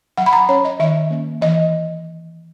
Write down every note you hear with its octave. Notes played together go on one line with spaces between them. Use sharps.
F#3 F#5
B5
A#5
C#4 C#5
D#5
D#3 E5
A#3 C#4
E3 D#5